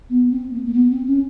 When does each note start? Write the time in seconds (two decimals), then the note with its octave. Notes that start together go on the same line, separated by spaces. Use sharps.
0.10 B3
0.31 C4
0.53 A#3
0.66 A#3
0.74 B3
0.91 C4
1.07 C#4